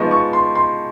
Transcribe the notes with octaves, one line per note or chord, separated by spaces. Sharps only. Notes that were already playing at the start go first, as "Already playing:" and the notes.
Already playing: F3 G#3 B3 D#4 C#6
C#6
C6
C6